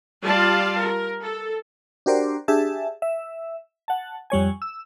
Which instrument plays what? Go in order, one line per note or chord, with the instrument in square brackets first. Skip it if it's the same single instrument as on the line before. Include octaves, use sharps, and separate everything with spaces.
[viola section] G3 F4 D5 F5 A5
A#4
A4
[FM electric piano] D4 F#4 G4 A#4 C5 D5
D4 G4 G#4 E5 A5
E5
F#5 A5
F2 G3 C#5 G#5
E6